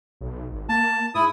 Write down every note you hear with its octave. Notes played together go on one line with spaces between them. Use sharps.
B1
G#1
A#3 A5
G#2 E4 D#6